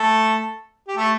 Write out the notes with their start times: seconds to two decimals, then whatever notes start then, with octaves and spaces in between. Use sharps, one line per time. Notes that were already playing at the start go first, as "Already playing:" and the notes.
Already playing: A3 A4
0.87 G4
0.96 A3 A4